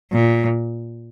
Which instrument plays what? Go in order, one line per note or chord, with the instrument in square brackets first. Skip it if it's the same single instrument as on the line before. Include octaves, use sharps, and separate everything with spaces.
[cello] A#2